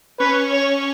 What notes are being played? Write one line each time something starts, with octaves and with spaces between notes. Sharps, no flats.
C#4 B4
C#5